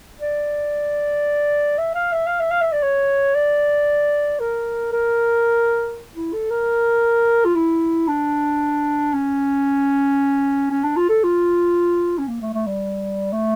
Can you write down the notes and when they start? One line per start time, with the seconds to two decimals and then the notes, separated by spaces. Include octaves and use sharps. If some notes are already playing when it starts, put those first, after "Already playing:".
0.20 D5
1.78 E5
1.95 F5
2.12 E5
2.27 F5
2.40 E5
2.51 F5
2.61 E5
2.72 D5
2.83 C#5
3.35 D5
4.40 A#4
4.93 A#4
6.16 E4
6.33 A4
6.51 A#4
7.45 F4
7.55 E4
8.08 D4
9.13 C#4
10.71 C#4
10.84 D4
10.96 F4
11.09 A4
11.23 F4
12.18 C#4
12.28 A#3
12.41 A3
12.54 A3
12.67 G3
13.32 A3